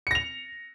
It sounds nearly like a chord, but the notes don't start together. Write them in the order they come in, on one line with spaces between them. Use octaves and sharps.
C#7 A#6 F7